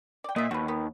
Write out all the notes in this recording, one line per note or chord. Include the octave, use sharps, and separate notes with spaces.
D5 G5
A#2 D#5 E5
D#2 F#4 B4
D#3 B3